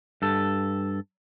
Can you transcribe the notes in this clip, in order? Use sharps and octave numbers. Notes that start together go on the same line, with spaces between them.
G2 A4